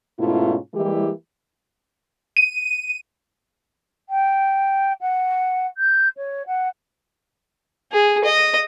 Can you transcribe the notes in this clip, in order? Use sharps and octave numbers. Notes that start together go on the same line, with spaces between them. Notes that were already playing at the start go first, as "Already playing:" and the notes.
G#2 B2 A3 C#4 E4 F4
E3 G3 G#3 A#3 E4 G4
D#7
G5
F#5
G6
C#5
F#5
G#4
D#5